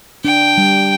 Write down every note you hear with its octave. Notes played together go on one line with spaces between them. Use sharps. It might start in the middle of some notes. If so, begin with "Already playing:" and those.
D4 G5
G3